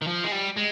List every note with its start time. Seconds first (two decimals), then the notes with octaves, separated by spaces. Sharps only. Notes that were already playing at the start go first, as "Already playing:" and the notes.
0.02 D#3
0.07 F3
0.24 G#3
0.32 G3
0.56 G#3